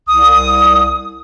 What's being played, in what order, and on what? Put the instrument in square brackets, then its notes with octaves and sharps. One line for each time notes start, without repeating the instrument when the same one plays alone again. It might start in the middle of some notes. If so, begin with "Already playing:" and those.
[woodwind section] C2 D#6